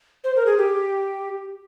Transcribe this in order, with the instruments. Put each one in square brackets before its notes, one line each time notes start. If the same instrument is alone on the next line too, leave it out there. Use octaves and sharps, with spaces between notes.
[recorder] C5
A#4
G#4
G4